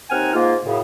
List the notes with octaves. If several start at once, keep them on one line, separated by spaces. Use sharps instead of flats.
D#2 C4 D#4 F#5 G#5 F6
G#2 A#3 F4
F#2 A2 C#3